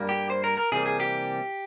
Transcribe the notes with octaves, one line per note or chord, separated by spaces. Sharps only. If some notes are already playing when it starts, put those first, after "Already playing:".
Already playing: G2 G3 A#3
G4
C5
A#4
A#4
C3 E3 G3 A#3 G#4
G#4
G4